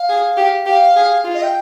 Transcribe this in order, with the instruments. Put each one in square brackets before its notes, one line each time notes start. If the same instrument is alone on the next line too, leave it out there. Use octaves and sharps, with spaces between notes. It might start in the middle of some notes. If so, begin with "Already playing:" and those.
Already playing: [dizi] F5
[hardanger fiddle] G#4
G4
[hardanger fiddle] G4 [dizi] F5
[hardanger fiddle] G#4
F4
[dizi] D#5
G5